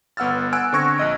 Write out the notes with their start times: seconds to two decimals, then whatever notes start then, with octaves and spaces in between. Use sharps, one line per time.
0.17 G1 B3 F#5 E6 F6 A6
0.52 F#5 G#5 E6 F#6 D7
0.73 D3 C4 C#6 G#6 A#6
0.98 A#1 D#5 D7